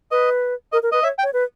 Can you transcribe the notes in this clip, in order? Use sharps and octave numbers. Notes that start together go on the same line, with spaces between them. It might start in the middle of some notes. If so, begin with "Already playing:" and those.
B4 D#5
A#4 D#5
A#4
B4 D#5
C#5 E5
G5
C#5
B4